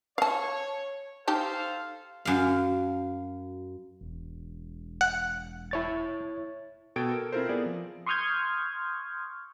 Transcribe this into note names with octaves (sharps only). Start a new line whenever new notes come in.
C#5 F5 A5
D#4 G4 A4 C5 F5 A5
F#2 F5
E1
F#5
E4 C#5 A6
B2 A4 G5 E6 G#6 D7
A#4
C4 E4 F4 A4 A#4 C5
B3 G#4 A#4 D5
F3
C6 C#6 D#6 F6 G6 G#6